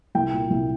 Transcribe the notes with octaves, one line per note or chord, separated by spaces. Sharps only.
C2 G5
A#2
C2